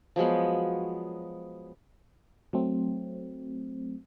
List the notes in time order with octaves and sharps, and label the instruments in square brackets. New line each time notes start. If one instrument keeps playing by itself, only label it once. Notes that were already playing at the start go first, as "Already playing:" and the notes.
[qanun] F3 F#3 G#3 B3
[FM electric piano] F#3 A3 C4